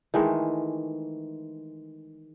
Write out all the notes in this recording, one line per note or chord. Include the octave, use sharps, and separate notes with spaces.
D#3 E3 G#3 A3